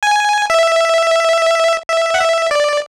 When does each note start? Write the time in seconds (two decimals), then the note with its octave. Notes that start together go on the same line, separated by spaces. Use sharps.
0.03 G#5
0.50 E5
1.88 E5
2.14 F#5
2.20 E5
2.51 D5